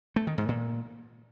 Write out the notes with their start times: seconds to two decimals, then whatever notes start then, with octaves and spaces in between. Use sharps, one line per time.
0.16 A3
0.27 D#3
0.38 G#2
0.48 A#2